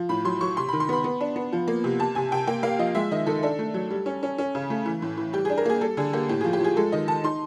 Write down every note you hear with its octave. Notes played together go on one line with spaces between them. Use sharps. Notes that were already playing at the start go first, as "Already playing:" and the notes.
Already playing: F3
A2 B5
F#3 C6
F#3 C#6
C3 C6
D#3 B5
C6
B3 B5
B3
D4
B3
F3
A#3
C3
C3 A5
C3 G#5
C3 G5
A#3 G5
A#3 F5
F3 D#5
G#3 E5
D#3 D#5
D#3 A4
D4 A4
A3
F#3
G3
C#4
C#4
C#4
C#3
A3
E3
A2
E3
G3 G4
D4 G#4
A#4
A#3 G#4
G3 A4
D3 G#4
A#3 G4
A2 G4
F3 G#4
G4
F3 G#4
G#3 A4
D#3 D#5
D#3 A5
D#4 C6